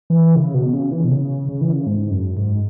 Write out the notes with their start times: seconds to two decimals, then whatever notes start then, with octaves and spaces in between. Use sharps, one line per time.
0.10 E3
0.35 C#3
0.54 B2
0.73 C#3
0.91 E3
1.05 B2
1.11 C#3
1.49 C#3
1.61 E3
1.73 C#3
1.87 G#2
2.11 F#2
2.37 G#2